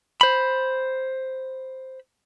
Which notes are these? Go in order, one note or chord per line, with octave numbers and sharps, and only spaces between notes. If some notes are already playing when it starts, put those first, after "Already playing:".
C5 B5